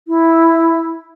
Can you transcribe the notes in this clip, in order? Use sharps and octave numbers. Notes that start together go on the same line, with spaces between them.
E4